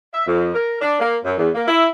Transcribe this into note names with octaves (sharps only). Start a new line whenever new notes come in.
E5
F2
A#4
D4
A#3
F#2
E2
A#3
E4